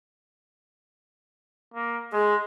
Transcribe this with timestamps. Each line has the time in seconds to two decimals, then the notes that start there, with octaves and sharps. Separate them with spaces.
1.74 A#3
2.13 G#3 G#4